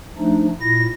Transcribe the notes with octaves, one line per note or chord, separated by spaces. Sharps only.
F3 A3 D4 D#4
A#2 E4 A#6